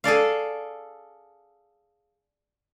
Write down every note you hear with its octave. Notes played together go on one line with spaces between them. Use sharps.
G#4 A4 D5 F5